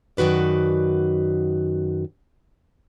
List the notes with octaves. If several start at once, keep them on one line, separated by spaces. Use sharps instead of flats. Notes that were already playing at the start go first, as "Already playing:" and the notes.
F#2 D#3 F#4 B4 D5